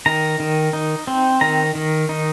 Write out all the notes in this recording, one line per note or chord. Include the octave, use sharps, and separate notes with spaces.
D#3 A#5
D#3
D#4
C4
D#3 A#5
D#3
D#4